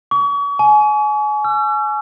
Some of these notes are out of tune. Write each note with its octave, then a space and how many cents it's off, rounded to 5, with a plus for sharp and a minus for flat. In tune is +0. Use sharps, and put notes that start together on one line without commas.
C#6 +40
G#5 +30
E6 +45